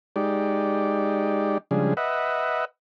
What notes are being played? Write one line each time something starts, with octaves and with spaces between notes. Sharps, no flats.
G#3 D#4 G4 D5
C#3 F3 G3 G#3 D4 G#4
B4 D#5 E5 F#5